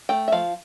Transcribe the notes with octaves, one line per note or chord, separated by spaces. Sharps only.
A3 G5
E5
F3 F5